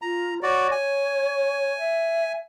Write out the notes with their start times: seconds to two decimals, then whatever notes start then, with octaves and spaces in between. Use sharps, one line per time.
0.02 F4 A#5
0.43 F#4 C#5 D5
0.72 G#5
1.78 E5